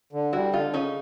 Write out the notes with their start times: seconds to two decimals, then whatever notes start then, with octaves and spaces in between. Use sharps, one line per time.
0.13 D3
0.33 G3 E4 F#4
0.53 D3 D#4 F4
0.74 C#3 C#4 D#4